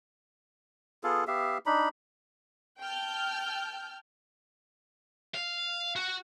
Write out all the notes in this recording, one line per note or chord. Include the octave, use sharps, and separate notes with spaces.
B3 F4 G#4 A4
B3 G4 E5 F5
D4 D#4 B5
G5 A5 F6 G6
F5
F#4